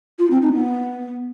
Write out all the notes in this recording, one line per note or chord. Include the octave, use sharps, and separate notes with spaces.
F4
C4
D#4
B3